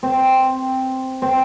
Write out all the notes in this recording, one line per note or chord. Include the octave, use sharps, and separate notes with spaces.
C4
C4